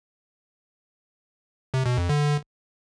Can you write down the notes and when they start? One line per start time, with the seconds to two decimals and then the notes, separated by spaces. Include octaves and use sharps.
1.74 C3
1.86 B2
1.98 F2
2.09 D3